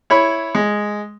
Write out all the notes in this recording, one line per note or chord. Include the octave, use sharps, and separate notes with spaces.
E4 C#5 B5
G#3